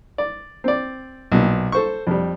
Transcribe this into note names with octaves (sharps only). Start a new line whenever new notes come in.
D5
C4 D5
B1 A#2
A4 C5 C#6
F2 G3